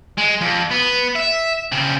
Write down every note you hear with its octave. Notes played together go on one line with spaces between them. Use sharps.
G#3
F2
B3
E5
C#3 C4